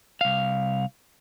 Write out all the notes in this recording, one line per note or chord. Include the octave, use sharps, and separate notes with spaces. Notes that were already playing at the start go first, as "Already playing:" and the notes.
C2 F5